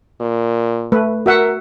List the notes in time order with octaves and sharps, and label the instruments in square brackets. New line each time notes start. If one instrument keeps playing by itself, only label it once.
[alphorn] A#2
[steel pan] A3 B4
[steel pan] F#4 E5 F#5 [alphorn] A#4